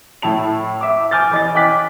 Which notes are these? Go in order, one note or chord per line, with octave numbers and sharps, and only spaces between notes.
A2 E4 A5 F7
E5 D6
G#5 D6 F6 G6 A6
E3 D#5 A6
G5 G#5 D6 F#6 B6